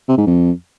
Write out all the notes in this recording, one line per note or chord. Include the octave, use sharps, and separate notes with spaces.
C3
G#2
F2